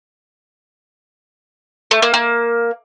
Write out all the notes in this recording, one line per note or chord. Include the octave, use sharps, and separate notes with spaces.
A3
A#3
A#3